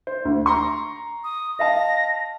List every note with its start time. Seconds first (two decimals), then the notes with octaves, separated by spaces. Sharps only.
0.07 C5
0.25 D2
0.46 A#5 C6 C#6
1.24 D#6
1.59 D#5 F5 A5 A#6